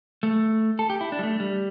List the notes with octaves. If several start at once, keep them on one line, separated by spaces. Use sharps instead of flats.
A3
A4
G4
E4
D4
G3
A3
G3